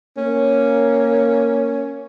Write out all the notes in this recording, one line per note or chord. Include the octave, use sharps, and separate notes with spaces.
A#3 C#4